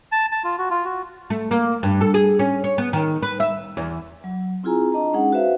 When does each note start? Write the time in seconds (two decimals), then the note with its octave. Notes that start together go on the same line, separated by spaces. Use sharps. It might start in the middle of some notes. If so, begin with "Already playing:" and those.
0.12 A5
0.32 A5
0.44 F4
0.58 F#4
0.71 F4
0.85 F#4
1.30 A3
1.51 A#3
1.83 G2
2.01 A4
2.14 G#4
2.39 C#4
2.64 C#5
2.78 B3
2.93 D#3
3.22 B4
3.40 E5
3.77 E2
4.24 F#3
4.64 C4 E4 F4 G#4 G#5 A#5
4.92 D4 D#5 A5 A#5
5.13 G#3 C#4 D#4 G#4 F#5
5.32 F#4 B4 C5 E5 F5